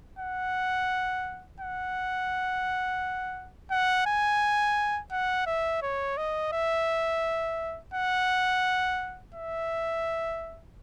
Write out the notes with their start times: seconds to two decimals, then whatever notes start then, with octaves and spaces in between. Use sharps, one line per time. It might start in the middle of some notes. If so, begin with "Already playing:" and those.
0.19 F#5
1.60 F#5
3.71 F#5
4.06 G#5
5.12 F#5
5.47 E5
5.82 C#5
6.17 D#5
6.53 E5
7.94 F#5
9.34 E5